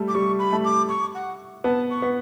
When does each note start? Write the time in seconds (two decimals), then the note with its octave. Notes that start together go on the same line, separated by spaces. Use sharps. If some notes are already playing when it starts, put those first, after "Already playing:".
Already playing: G3 A3
0.08 D6
0.15 G3 C#6
0.39 B5
0.52 A3
0.65 D6
0.89 C#6
1.15 F#5
1.64 B3 A5
1.90 C#6
2.02 B3